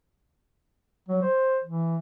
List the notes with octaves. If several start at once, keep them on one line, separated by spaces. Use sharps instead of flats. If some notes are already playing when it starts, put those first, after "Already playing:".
F#3
C5
E3